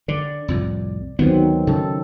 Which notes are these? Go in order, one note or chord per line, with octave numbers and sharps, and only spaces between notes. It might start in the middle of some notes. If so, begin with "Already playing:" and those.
D3 D5
C2 F2 A2
D2 D#3 F#3 B3 C4
C#3 A4